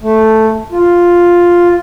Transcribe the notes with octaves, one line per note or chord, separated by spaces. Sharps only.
A3
F4